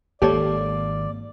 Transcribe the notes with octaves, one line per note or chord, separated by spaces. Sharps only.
G#1 A#3 G4 A4 C#5 D5